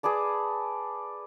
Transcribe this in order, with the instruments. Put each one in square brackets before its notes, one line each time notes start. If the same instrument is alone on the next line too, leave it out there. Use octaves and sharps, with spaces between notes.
[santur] G#4 B4 D5 A5